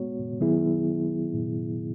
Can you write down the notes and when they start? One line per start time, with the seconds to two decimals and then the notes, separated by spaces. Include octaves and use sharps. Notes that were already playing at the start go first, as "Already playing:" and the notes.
Already playing: G#3 B3 F#4 C#5
0.40 D#3 F#3 B3 E4 G#4